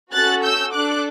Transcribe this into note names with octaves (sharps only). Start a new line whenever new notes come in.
C#4 F#4 A4 F#6 A6
E6 G6
D4 A4 D6 F#6